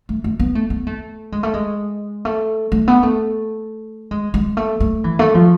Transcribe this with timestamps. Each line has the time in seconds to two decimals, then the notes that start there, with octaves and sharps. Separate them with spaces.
0.09 A3
0.24 A3
0.40 B3
0.55 A3
0.70 B3
0.87 A3
1.32 G#3
1.43 A3
1.54 G#3
2.25 A3
2.72 A3
2.88 B3
3.03 A3
4.11 G#3
4.34 G#3
4.57 A3
4.80 A3
5.04 E3
5.19 A3
5.35 F3